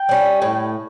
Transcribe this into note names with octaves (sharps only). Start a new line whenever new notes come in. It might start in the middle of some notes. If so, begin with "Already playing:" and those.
Already playing: G5
G3 C#4
A2